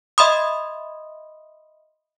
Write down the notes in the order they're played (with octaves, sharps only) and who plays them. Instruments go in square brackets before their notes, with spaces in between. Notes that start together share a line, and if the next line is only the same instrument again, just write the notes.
[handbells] D#5 E5 B5 C6 D#6